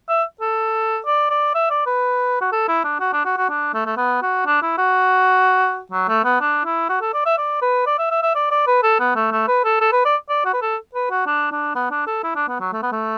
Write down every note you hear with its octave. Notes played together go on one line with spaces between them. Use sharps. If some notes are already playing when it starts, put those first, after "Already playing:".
E5
A4
D5
D5
E5
D5
B4
F#4
A4
E4
D4
F#4
D4
F#4
F#4
D4
A3
A3
B3
F#4
D4
E4
F#4
F#3
A3
B3
D4
E4
F#4
A4
D5
E5
D5
B4
D5
E5
E5
E5
D5
D5
B4
A4
B3
A3
A3
B4
A4
A4
B4
D5
D5
F#4
B4
A4
B4
F#4
D4
D4
B3
D4
A4
E4
D4
B3
F#3
A3
B3
A3